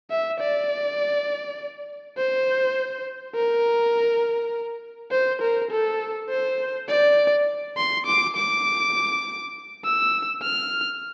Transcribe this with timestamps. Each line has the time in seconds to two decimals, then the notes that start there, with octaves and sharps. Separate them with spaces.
0.10 E5
0.40 D5
2.17 C5
3.35 A#4
5.11 C5
5.42 A#4
5.71 A4
6.30 C5
6.88 D5
7.77 C6
8.06 D6
8.36 D6
9.84 E6
10.42 F6